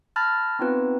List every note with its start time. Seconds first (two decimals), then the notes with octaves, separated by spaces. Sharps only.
0.16 A5 B5 F6 G6 A6 A#6
0.59 B3 C4 D#4 F4 B4